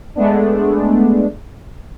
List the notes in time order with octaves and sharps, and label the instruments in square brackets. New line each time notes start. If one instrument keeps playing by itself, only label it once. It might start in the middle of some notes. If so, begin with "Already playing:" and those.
[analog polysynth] G#3 A3 B3 D4